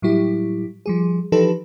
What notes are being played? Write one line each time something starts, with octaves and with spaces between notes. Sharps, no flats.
A2 F#3 G3 E4 G4
F3 G3 G#4
E3 F3 D#4 G4 A4 B4